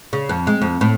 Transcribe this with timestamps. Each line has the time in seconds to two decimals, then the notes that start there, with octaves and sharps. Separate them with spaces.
0.13 C#3
0.29 F2
0.47 G#3
0.61 F2
0.81 A2